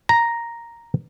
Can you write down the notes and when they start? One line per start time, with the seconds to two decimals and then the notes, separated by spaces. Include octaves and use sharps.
0.09 A#5